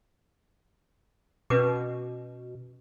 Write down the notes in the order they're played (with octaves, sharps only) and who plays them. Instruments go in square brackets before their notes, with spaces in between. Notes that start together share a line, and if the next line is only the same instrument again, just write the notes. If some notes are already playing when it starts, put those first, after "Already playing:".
[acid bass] B2 [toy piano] C#4 B4 D6